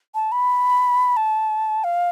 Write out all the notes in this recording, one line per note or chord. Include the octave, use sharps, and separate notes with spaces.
A5
B5
A5
F5